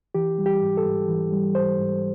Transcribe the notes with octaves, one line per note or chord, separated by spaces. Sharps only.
E3 G4
G3
G4
G#2
A4
G#2
E3
G3
G#2 C5
G#2